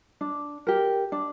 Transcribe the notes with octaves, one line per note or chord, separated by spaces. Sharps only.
D4
G4 A#4
D4